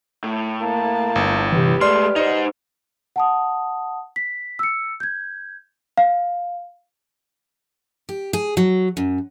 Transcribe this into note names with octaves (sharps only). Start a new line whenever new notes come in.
A2
A#3 A5
G1
C3 E3 G4 B4
G#3 A3 D5 C6 F6
D#4 C5 D#5
F#5 A5 D#6
B6
E6 C#7
G6 G#6
F5
G4
G#4
F#3
F#2